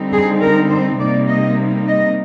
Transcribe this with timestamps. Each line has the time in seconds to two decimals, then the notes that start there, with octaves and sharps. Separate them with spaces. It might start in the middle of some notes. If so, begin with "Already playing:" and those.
Already playing: D3 G3 C4 D#4
0.13 G#4
0.42 A#4
0.70 C5
1.00 C3 G3 A#3 D#4 D5
1.28 D#5
1.87 D#5